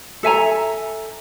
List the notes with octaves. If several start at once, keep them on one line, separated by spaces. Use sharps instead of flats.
A4 E5 G#5 A#5